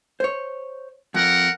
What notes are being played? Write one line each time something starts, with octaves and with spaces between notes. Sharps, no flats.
C5 C#5
F2 A#4 F#5